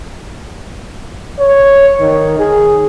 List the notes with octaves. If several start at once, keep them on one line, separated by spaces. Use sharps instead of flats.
C#5
D#3
G#4